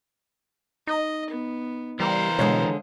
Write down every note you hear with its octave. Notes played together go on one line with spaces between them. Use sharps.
D#4 D#5
B3
E3 G3 A#4 C5 F5
B2 D3 G#3 C#5